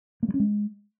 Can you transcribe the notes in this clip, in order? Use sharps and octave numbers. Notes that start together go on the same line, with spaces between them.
A#3
G3
C#4
G#3